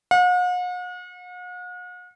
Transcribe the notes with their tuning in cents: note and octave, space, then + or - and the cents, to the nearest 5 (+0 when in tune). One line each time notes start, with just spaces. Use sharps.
F#5 -45